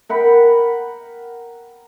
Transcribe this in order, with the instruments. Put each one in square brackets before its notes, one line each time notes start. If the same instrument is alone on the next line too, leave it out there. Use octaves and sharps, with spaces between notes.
[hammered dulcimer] A#4 F#5 G5 B5